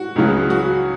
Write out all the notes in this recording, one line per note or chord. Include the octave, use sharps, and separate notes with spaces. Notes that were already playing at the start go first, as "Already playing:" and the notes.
Already playing: F#4
C#2 C#3 F#3
F#4